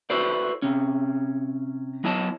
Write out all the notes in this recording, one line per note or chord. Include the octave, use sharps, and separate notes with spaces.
E4 F#4 A4 B4 C5 D5
C3 C#4
F#3 B3 E4 C#5 D#5 A5